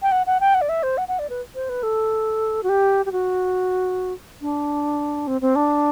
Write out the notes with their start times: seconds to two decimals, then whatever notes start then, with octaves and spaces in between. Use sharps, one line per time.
0.02 G5
0.12 F#5
0.26 F#5
0.40 G5
0.54 F#5
0.61 D5
0.69 E5
0.83 C5
0.98 F#5
1.08 F#5
1.19 D5
1.30 B4
1.55 C5
1.69 B4
1.83 A4
2.63 F#4
2.69 G4
3.06 G4
3.12 F#4
4.41 D4
5.27 C4
5.41 C4
5.55 D4